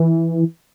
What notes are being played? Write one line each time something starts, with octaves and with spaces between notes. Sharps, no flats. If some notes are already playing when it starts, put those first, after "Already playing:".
Already playing: E3